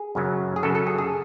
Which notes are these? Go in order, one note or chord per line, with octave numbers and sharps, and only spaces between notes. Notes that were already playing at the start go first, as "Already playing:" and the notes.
Already playing: G#4
F#2 C#3 F#3
G#4
F#2 C#3 F#3 A4
A4
G#4
G#4